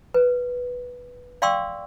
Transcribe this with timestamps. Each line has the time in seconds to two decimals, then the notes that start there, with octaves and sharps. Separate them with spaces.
0.14 B4
1.42 D5 F5 G5 C6 C#6 E6